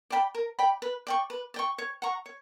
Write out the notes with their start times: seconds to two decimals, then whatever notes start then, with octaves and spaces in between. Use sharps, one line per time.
0.10 D5 G5 B5
0.35 A#4
0.59 D5 G5 B5
0.82 B4
1.07 D5 G5 C#6
1.30 B4
1.54 D5 G5 C#6
1.78 C#5
2.02 F#5 A#5 C#6
2.26 C#5